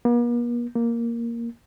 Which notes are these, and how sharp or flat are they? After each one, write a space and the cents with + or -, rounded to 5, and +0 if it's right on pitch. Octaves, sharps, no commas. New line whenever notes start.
A#3 +45
A#3 +0